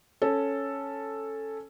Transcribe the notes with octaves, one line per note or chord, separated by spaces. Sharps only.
C#4 A4